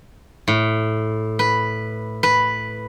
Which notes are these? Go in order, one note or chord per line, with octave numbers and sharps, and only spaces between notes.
A2
B4
B4